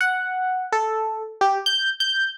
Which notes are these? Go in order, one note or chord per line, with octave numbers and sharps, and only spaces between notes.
F#5
A4
G4
G6
G6